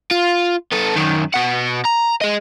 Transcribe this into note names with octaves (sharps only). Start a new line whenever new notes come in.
F4
B3 A4
F#2 D#3
B2 F#5
A#5
G#4 D#5